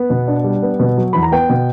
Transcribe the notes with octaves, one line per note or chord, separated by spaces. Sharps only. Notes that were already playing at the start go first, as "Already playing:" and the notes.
Already playing: B3 F#5
B2
D4
G3
B3
B2
F#3
E2 B5
A#5
B3 G5
B2